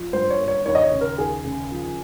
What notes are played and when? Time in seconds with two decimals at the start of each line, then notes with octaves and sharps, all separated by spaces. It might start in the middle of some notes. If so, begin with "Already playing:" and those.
Already playing: F3
0.13 G2 C5
0.30 C#5
0.39 A#3
0.48 C#5
0.66 D#2 C#5
0.75 D#5
0.83 C#5
0.92 C#3
1.01 A#4
1.18 D#2 G#4
1.44 C#3
1.72 F3